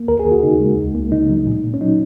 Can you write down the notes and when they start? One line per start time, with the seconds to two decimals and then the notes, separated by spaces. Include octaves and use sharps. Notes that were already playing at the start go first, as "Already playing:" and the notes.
Already playing: A#3
0.08 D#2 A#4
0.20 G#4
0.25 D#2
0.32 F#4
0.43 C#3 D#4
0.60 G#3
0.77 C#2
0.95 A#3
1.12 C#3 D#4
1.30 F#3
1.47 A#2
1.64 A#2
1.74 C#4
1.81 F#3 D#4